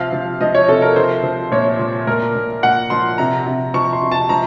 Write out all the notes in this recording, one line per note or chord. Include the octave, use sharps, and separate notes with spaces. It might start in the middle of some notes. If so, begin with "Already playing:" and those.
Already playing: C3 F3 F5
F3
F3 D#5
C#5
C3 A4
A#4
F3 C5
F3
A#2 C#5
F3
A#2 A#4
A#2
A#2 F#5
F3 C6
C3 A#5
C3
F3 C#6
C6
C3
A5
F3 A#5